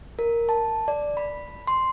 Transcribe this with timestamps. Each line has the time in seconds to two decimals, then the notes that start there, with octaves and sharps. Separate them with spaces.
0.19 A#4
0.49 A5
0.88 D5
1.17 B5
1.67 C6